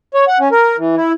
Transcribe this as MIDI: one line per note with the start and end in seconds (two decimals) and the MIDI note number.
0.14 0.24 73
0.28 0.38 78
0.40 0.48 61
0.52 0.76 70
0.78 0.95 52
0.96 1.12 64